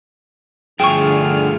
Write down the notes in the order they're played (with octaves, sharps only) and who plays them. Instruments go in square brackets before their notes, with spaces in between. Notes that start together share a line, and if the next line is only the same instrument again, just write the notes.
[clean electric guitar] G2 F3 A3 [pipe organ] D3 F6 [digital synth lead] G#4 [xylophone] G5 C#6